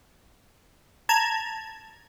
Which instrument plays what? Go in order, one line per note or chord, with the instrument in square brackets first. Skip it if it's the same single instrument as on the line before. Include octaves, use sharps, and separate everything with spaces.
[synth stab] A5 A#5 G#6